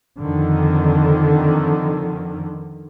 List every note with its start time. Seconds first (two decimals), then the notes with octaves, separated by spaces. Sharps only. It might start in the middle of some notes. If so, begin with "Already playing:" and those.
0.18 F2 D3 D#3